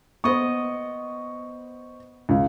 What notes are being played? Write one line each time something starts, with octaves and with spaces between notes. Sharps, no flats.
B3 C5 D#5 C#6
C#2